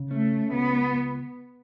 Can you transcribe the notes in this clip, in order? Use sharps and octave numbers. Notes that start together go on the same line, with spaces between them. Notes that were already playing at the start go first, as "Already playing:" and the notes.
Already playing: C#3
A3 C#4
C#2 B3